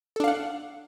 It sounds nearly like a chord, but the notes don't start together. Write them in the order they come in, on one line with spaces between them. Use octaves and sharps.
A4 D4 F5 F#5